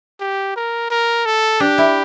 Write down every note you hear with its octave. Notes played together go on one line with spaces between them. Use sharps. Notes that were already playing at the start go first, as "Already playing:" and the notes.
G4
A#4
A#4
A4
D4 G4
E4